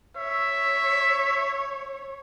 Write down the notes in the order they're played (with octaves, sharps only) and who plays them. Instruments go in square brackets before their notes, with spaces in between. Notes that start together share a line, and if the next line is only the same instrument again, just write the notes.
[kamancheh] C#5 [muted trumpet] E5